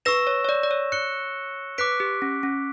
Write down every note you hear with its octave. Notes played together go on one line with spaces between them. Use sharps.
B4 C#6 E6 A#6 E7
C#5
C#5
D5
D5
C#5
F#6 C#7 G7
B4 D6 F#6 B6 D7
G4
C#4
C#4